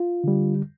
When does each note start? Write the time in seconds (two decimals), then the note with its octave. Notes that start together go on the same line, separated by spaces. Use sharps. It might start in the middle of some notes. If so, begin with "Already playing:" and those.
Already playing: F4
0.24 D3 G3